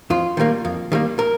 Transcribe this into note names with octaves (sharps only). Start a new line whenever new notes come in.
F2 F4
D#3 G3 A#3
F2
D#3 G3 A#3
A#4